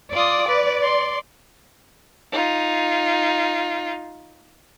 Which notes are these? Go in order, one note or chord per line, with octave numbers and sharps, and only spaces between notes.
F4 D5 D#6
B4
C6
D#4 F4